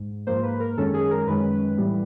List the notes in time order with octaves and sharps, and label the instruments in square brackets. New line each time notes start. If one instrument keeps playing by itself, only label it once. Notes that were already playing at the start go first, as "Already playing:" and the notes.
Already playing: [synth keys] G#2
G#2 F3 A#3 C5
B4
A#4
F#2 D#3 G#3 C#4 A4
G#4
A#4
F#2 D#3 G#3 C#4 B4
A2 E3 G3 B3